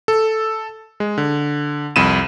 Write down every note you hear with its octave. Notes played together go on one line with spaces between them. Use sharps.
A4
G#3
D3
C2 F2 B5 D#7 E7